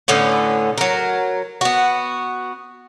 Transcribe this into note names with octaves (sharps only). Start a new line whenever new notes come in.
A2 D3 B3 C#4
F#3 A#4
B3 F#4